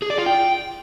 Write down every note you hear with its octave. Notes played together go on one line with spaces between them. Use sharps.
G#4
D5
F4
G5